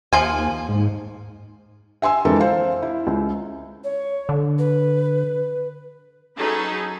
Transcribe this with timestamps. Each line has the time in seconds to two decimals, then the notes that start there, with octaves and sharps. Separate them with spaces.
0.13 D#2 F3 C5 G#5
0.69 G#2
2.02 E5 G#5 C6 E6
2.25 F2 E3 G#3 D4 A4 A#4
2.40 C5 F5
2.82 E4
3.07 C#2
3.84 C#5
4.29 D3
4.58 B4
6.37 F#3 C#4 D#4 G#4 A4 B4